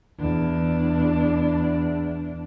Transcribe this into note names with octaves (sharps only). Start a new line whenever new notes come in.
E2 D4